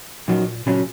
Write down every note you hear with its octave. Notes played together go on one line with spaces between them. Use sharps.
F#2 A#2 D#3 F#3
A#2 C#3 F#3 C#4